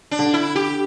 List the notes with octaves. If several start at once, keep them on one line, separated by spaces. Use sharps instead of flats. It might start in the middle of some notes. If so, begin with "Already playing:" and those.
D4
D3
E4
G4